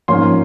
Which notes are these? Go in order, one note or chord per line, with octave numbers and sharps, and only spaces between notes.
G#2 F3 A#3 C#4 C6